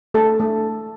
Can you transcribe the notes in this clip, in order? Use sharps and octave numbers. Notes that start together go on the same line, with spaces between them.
A3 A4 A5
A3